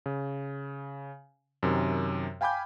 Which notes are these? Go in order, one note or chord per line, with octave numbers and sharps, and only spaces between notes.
C#3
F#2 C3 D#3
F5 G5 G#5 B5 D6 G6